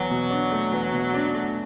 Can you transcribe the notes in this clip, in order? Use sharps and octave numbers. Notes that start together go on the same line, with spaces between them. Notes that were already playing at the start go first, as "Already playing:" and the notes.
Already playing: E2 F#3
B2
D4
A3
E2
B2
D4
A3